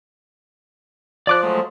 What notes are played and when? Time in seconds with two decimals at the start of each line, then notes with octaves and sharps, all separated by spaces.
1.27 F3 D5 D6 F#6
1.43 F#3 G#3 A3